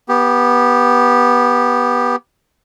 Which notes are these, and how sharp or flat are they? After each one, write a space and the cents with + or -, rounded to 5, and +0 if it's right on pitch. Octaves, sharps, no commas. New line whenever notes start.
B3 -15 G4 +0